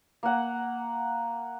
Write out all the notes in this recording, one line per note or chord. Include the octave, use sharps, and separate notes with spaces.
A#3 F#5